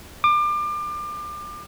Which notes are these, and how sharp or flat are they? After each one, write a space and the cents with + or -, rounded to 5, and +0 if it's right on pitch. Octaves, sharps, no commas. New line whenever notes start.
D6 +30